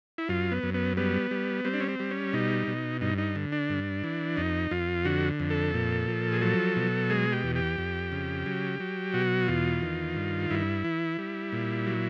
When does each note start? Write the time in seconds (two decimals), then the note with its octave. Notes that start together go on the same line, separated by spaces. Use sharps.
0.18 E4
0.29 F#2 F4
0.52 B3
0.63 F#2
0.74 B3
0.97 G3 B3
1.31 G3
1.65 G3 C4
1.74 D4
1.80 C#4
1.88 C4
1.99 G3
2.11 C#4
2.33 B2 D#4
2.67 B2
3.01 G2 D#4
3.18 D#4
3.36 D3
3.52 D4
3.70 G2
4.04 E3
4.37 F2 D#4
4.71 F2 F4
5.05 D3 F#4
5.40 F2
5.50 A4
5.74 A#2
6.08 F3
6.32 G#4
6.41 F#3 A4
6.76 B2
7.10 G#3 G#4
7.33 G4
7.44 E2
7.56 G4
7.78 F2
8.12 C#3
8.46 F#3
8.80 F#3
9.14 B2 F#4
9.48 E2 F4
9.82 D#3
10.16 G2
10.50 G2 E4
10.84 E3
11.18 G3
11.52 A#2
11.87 F#3